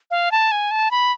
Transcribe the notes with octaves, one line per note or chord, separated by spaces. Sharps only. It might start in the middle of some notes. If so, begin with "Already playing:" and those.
F5
A5
G#5
A5
B5